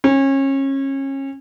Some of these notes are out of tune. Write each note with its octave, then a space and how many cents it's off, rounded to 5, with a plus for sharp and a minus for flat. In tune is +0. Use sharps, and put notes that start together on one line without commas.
C#4 -30